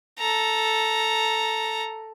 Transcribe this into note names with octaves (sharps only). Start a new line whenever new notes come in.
A4 A#5